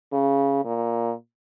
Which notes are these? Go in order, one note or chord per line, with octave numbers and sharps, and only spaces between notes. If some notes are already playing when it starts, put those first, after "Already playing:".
C#3
A#2